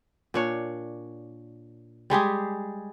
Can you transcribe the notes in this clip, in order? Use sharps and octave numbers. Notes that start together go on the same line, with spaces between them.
A#2 D4 C#5
G3 G#3 G4 G#4